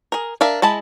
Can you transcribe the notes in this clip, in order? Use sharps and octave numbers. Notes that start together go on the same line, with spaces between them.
G#4 A#4
D4 A#4 E5 F5
G#3 E4 A5 B5